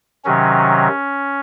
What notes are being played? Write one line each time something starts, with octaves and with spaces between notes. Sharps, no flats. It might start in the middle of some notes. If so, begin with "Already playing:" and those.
C3 D#3 F#3 C#4